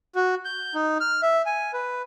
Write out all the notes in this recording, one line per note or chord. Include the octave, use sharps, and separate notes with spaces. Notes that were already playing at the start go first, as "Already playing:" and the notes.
F#4
G6
D#4
F6
E5
G#5
B4